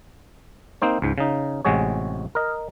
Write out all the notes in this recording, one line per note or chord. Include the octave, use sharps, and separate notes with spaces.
A#3 C4 D#4 C5
C#2 G#2
C#3 D#4
A1 C3 G#3 F#4 G#4 C#5
A#4 D#5